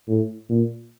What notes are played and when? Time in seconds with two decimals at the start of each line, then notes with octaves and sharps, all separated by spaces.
0.08 A2
0.49 A#2